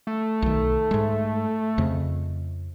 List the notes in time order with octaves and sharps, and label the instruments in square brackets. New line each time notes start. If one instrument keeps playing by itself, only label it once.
[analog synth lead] A3
[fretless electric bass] B1 D#3
G#2 G#3
F2 C#3